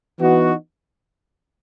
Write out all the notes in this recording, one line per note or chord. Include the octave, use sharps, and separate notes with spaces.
E3 B3 D#4 F#4